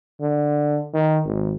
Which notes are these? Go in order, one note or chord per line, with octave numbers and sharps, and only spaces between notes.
D3
D#3
G#1